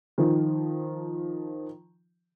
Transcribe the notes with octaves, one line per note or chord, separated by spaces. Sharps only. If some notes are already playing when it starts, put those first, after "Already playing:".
D#3 F3